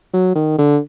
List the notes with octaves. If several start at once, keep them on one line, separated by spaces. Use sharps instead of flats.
F#3
D#3
D3